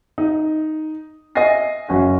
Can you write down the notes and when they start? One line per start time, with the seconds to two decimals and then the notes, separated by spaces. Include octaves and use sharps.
0.18 D#4
1.35 D#5 E5 G#5 A#6 C7
1.89 F#1 C#4 F#4 E5